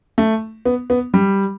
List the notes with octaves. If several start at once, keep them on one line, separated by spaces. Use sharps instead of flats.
A3
B3
B3
G3